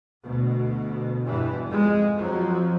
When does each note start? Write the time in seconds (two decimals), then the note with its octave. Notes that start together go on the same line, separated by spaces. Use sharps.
0.22 D2 B2
1.23 E2 G2 B2 E3
1.66 F2 G#3
2.18 F2 F3 F#3